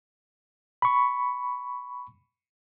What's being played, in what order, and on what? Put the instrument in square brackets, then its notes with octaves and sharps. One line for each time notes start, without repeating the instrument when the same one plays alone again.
[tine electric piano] B5 C#6